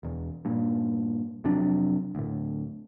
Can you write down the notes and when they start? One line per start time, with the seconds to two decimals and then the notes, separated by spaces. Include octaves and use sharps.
0.03 E1 E2
0.45 G2 A#2
1.44 F1 C3 F#3 D4
2.15 D2 A2